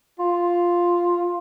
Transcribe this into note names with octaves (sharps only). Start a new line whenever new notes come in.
F4